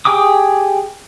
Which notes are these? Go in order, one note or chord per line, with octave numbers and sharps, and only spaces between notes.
G4 G#4 G5 D6 D#6